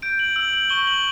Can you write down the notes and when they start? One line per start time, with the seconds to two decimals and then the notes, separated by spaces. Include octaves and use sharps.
0.02 G6 D7
0.19 F#7
0.36 E6 F#7
0.53 F#7
0.70 C#6 G7
0.87 F#7